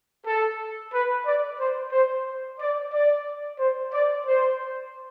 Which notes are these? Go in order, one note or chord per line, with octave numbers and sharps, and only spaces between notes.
A4
B4
D5
C5
C5
D5
D5
C5
D5
C5